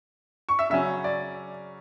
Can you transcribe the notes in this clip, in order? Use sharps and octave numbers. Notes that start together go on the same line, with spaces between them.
C#6
E5
C#3 F#3 C#4 E5
D5